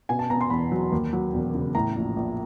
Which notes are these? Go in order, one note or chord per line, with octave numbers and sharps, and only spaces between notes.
B2 G#5
A5
B3 A#5
C6
E2 B5
F#3
D#2
F#3
E1
C#3
A2 A#5
A#1
A#1